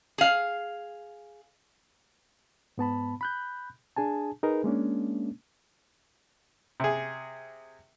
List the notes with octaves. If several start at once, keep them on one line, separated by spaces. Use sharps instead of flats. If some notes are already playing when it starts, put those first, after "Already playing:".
G#4 F5
G#2 B3 A5 B5
B5 F#6 G6
D4 G#4 G#5 A5
D#4 G#4 A#4 B4
G#3 A#3 C#4 D4
C3 G#4